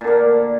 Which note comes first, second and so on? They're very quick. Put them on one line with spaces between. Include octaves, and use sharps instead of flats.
A#2 D3 A#3